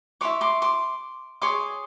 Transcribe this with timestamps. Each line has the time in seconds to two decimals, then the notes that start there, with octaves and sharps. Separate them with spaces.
0.21 E4 A4 C#5 C6 D6
0.41 C6 D6
0.62 C6 D6
1.42 G#4 C#5 C6 D6